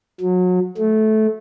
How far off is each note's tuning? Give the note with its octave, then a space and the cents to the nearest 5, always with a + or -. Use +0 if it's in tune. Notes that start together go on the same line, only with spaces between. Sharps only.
F#3 -30
A3 -15